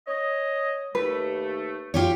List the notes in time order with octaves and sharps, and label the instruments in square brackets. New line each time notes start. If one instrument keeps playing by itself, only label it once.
[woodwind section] C#5 D#5
[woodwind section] D#2 A3 [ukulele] B4
[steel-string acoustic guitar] F4 G4 C#5